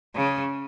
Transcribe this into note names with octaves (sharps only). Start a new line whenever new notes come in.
C#3